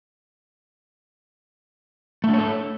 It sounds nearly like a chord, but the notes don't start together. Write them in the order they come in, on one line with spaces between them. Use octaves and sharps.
A3 D4 C#5 A4